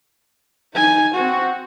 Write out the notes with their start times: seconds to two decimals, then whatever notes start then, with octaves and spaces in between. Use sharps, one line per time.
0.74 D#4 G#5
1.14 C4 F#4